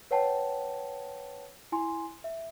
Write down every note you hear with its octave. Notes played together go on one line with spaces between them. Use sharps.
B4 C#5 F#5 G5 A5
E4 G#5 C6
E5